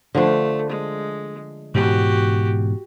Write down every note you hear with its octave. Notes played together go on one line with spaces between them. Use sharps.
D3 F3 A3 D4
G#3
G#2 B2 E3 F#4 G4